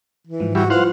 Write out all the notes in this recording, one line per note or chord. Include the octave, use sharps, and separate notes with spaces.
E3
G#2 F3
E3 G3 F#4
F3 E4 F4 B4 C5 F5 F#5